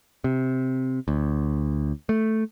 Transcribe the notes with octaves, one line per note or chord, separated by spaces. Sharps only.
C3
D2
A3